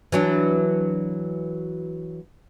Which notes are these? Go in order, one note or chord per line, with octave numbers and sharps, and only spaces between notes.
E3 F#3 D4